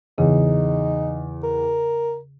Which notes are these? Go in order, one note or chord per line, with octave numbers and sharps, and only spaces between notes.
E2 C#3 D#4
A#4